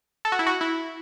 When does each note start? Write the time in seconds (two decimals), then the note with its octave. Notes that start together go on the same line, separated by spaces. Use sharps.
0.25 A4
0.32 F#4
0.39 E4
0.47 F#4
0.61 E4